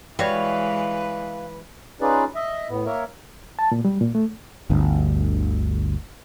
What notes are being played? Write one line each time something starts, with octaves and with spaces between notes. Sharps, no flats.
E3 G3 G#3 F#4 B4 C#5 F5
C#4 D#4 F4 G#4 B4 D5
D#5 E5
A2 B3
A#3 A#4 C#5 E5
A5
A#2
G3
A#2
A3
G1 D2